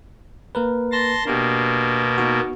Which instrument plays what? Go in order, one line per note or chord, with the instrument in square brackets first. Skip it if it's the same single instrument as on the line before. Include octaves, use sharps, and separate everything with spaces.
[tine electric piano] A#3 A#4 B4
[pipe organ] A5 C6 A#6
[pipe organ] B2 A#3 [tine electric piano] D4 G4
[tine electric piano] B3 D#4 F#4